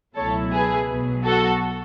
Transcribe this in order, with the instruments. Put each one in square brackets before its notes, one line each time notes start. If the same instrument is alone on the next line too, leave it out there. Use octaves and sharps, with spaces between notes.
[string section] C#2 B2 F#3 A3 E4 A4 C#5
G#4 B4
B1 B2 F#3
F#4 A4